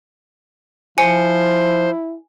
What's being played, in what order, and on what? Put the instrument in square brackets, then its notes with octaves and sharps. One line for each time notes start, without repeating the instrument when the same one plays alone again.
[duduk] F3 [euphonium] E4 [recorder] C5 [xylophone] G#5 C#7